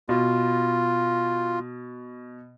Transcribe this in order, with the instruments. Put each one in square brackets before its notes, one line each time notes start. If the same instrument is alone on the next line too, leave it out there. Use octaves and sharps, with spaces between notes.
[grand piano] B2 [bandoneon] F4